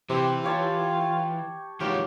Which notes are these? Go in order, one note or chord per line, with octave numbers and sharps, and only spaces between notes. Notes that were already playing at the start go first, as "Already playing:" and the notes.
C3 E3 G4
F4 G4 C#5 A5
D#3 E3 F#3 G#3 F4 G4